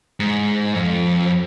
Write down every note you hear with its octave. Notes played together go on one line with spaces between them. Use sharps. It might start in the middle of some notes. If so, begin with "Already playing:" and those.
G#2
F2